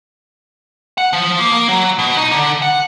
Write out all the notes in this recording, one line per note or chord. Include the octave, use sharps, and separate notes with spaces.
F#5
F3
A#3
A#3
F#3
B2
D#4
D3
F#5